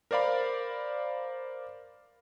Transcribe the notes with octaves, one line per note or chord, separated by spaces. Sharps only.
A#4 C5 D5 F5 B5